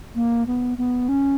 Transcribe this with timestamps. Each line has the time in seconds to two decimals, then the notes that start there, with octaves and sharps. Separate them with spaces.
0.16 A#3
0.47 B3
0.78 B3
1.09 C#4